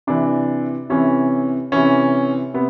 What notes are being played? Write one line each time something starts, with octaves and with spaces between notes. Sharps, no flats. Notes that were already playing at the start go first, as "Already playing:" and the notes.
C3 E3 D4
C3 E3 C#4
C3 E3 C#4
C3 B3